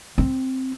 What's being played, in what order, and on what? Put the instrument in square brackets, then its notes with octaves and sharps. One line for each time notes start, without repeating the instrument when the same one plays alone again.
[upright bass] C4